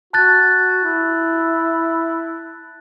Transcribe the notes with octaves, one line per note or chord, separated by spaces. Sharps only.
F#4 A5 F#6 A6
E4